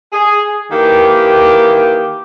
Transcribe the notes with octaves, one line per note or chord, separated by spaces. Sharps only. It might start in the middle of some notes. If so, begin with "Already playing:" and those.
G#4
D#3 E3 A#3 G4